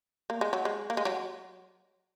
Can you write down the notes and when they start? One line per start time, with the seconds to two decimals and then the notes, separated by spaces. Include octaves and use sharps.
0.30 A#3
0.41 G#3
0.53 F#3
0.65 G#3
0.90 A#3
0.97 G#3
1.05 F#3